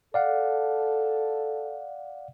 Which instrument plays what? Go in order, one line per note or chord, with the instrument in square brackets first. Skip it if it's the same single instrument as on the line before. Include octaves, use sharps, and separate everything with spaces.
[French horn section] A4 [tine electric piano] D5 F5 F#5